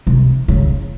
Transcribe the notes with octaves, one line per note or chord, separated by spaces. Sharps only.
C3
C#3